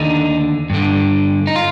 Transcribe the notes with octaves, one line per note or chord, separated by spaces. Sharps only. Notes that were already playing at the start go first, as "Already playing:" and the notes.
Already playing: D#2 D3 D#4
G2 D3
D#4
F4